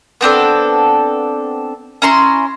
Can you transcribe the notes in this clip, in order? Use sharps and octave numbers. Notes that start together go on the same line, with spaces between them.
B3 C4 D4 A4
C#4 E4 A#5 C6